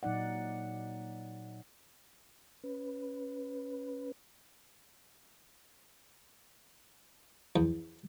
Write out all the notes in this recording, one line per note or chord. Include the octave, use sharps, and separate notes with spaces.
A#2 F#3 D#4 D5 F#5
C#4 B4
E2